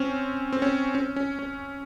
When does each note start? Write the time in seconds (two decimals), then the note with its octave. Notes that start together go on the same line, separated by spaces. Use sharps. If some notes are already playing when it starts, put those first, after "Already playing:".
Already playing: C4 C#4
0.53 C4
0.62 C#4
0.95 C#4
1.16 C#4
1.39 C#4